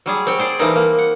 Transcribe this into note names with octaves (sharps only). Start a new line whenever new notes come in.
F#3 G3 G#4
C4 C#5 G5
G#4 C5 D5
E3 G3 A3 A#3 C4 D#4
A#3
F#5